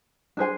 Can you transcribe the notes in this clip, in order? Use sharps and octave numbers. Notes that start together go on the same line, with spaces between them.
D4 G#4 C5 G#5